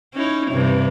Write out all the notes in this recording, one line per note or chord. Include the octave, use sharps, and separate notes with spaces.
C#4 D#4 E4
G2 C3 E3